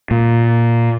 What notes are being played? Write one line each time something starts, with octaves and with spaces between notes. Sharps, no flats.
A#2